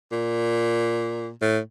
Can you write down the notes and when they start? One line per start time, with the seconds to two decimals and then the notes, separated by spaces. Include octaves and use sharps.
0.12 A#2
1.42 A2